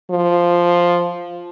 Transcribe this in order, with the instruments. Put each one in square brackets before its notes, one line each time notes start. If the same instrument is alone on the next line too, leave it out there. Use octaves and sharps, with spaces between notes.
[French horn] F3